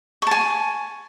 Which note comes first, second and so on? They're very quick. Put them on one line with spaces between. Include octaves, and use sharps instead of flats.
C#6 A5 G#5